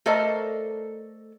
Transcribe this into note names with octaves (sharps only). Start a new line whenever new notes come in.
A3 A4 A#4 C5 D5 D#5